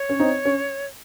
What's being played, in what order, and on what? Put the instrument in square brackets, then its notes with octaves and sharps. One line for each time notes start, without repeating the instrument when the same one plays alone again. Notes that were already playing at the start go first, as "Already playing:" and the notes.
Already playing: [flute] C#5
[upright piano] C#4
C4 D#4
C#4